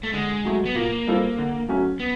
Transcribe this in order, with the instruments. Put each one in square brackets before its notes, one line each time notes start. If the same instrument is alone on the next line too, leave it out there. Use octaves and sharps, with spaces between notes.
[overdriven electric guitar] A3
[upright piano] D3 [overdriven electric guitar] G#3
[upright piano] F#3 A3
[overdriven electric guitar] B3
[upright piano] A#2 [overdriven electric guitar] A#3
[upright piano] G3 C4 F4 A4
D3
F#3 A3 C#4
[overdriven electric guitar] B3